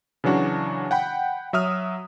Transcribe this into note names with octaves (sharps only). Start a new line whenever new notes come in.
C#3 E3 F#3 D4 F#4
F#5 G5 B5
F#3 E5 D#6 F6